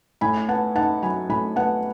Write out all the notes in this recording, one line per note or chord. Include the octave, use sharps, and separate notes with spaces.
A2 G#5 B5
B3 F#5 A5
D#4 F#5 A5
F#3 G#5 B5
A2 G#5 B5
B3 F#5 A5